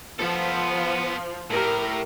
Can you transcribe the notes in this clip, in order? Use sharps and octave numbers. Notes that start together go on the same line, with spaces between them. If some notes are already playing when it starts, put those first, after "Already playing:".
F3 B3 A4
A2 G4 A#4